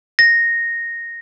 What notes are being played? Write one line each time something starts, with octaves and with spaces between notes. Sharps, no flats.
A#6